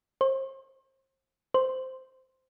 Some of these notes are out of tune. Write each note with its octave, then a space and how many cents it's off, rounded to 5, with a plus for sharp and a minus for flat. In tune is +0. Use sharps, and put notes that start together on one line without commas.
C5 +35
C5 -10